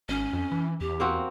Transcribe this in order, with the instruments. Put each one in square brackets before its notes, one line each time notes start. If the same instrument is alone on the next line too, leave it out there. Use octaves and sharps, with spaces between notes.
[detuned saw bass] G#1 [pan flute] C#4
[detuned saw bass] F2
E3
[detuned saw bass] E2 [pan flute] G4
[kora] A#3 C4 F#4